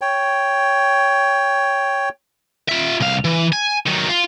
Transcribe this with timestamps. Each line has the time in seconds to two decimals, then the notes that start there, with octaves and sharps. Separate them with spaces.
0.01 C#5 G5
2.68 F4 E5
3.00 C2 F5
3.25 E3
3.53 G#5
3.87 D#3 F#3
4.09 F4